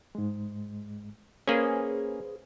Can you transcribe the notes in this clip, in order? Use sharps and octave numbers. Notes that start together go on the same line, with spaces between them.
G#2 G#3
A#3 C#4 G#4 B4 C5